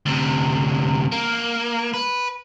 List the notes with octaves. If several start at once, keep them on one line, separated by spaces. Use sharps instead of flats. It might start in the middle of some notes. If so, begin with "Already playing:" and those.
D2 C3
A#3
B4